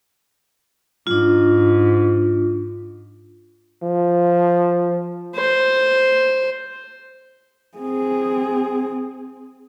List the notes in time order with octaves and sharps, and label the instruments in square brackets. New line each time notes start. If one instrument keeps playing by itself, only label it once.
[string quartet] G#2 [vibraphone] D4 F4
[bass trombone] F3
[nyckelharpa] C5
[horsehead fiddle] C4 G#4